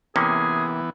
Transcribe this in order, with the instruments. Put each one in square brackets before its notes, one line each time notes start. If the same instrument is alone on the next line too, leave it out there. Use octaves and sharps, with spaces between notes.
[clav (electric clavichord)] C3 A#3 C#4 [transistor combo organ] E3 B3 [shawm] G#4